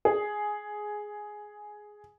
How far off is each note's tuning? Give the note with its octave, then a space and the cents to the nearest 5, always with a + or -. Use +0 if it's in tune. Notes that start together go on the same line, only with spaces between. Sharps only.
G#4 +5